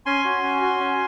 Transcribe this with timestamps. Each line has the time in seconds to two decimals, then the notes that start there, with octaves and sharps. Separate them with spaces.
0.06 C#4 G#5 C6
0.25 F#4
0.43 C#4
0.62 F#4
0.80 C#4